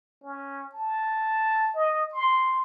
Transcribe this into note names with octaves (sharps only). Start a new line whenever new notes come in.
C#4
A5
D#5
C6